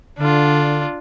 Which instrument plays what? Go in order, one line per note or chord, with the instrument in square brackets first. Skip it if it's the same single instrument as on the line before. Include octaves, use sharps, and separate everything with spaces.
[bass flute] D3 [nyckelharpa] D4 F4